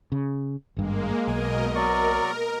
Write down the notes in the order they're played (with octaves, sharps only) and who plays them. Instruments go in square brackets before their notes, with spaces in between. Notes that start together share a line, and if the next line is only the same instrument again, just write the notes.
[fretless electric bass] C#3
[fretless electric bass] G#1 G2 [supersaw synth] G#3 A#3
[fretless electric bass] B1 [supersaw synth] B2 A#4 D#5 [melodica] G#5
[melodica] F#3 D5 C#6 [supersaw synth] A#4